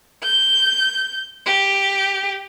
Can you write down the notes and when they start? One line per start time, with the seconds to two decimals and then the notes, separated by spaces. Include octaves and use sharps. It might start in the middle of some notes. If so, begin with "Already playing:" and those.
0.23 G6
1.47 G4